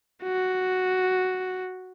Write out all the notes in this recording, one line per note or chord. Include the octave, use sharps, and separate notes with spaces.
F#4